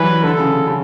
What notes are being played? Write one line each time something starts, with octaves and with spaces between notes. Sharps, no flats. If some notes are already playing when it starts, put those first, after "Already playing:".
Already playing: E3 F#3 G3 B4
D3 A4
C#3
C#3
C#3